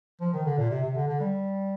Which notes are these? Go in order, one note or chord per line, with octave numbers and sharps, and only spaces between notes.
F3
D#3
D3
A#2
C3
C3
D3
D3
G3